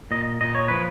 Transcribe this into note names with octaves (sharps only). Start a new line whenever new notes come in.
A#2 D#5
A#2 D#5
C#5
F3 B4